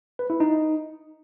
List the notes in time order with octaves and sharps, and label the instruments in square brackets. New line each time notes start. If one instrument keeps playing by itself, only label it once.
[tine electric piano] B4
E4
D#4